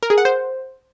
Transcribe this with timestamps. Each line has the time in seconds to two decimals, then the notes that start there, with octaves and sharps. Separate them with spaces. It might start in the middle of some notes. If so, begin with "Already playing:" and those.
0.03 A#4
0.10 G#4
0.18 F#5
0.25 C5